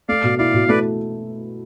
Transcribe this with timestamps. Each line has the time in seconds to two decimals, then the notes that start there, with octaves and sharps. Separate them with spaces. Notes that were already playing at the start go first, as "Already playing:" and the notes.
0.08 A3 D5 F5
0.24 B2
0.38 E4 D5 F5
0.54 B2
0.68 A3 B4 D5